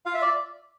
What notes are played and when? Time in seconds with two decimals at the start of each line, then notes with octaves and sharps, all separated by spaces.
0.06 F4 F5
0.14 E5
0.22 D5